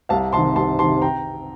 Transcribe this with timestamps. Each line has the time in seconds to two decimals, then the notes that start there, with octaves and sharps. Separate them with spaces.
0.09 C2 F5 A5
0.33 C3 A5 C6
0.37 D#3
0.56 C2 A5 C6
0.79 C3 A5 C6
0.82 D#3
1.02 G5 A#5